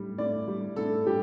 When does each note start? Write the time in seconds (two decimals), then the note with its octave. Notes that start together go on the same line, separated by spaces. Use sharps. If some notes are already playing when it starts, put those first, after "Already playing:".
Already playing: A2 G3
0.18 A2 D5
0.48 G3
0.76 A2 A4
1.06 G3 G4